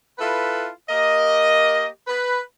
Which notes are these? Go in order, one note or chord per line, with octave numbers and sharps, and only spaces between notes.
E4 F4 A4 B4
A#3 G4 A#4 D#5
B4